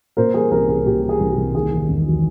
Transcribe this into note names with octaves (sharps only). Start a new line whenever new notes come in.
A#2 A#4 C5
G3 G#4 A#4
C2 G#4 A#4
C2 G#4
A#2 G4
G3
G#4
C2
G4
C2
D#2 G#4
D#3
E1
F#3